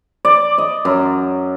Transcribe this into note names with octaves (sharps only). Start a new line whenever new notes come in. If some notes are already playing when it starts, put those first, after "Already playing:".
D5
D#5
F#2